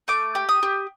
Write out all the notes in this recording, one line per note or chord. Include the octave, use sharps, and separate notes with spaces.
A3 D6
G4
D#6
G4